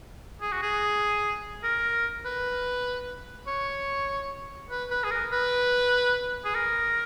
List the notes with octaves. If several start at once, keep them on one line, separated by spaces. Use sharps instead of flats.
G#4
F#4
G#4
A#4
B4
C#5
B4
B4
G#4
A#4
B4
G#4
A#4